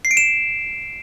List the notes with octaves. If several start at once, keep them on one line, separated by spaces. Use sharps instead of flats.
C7
D7
E7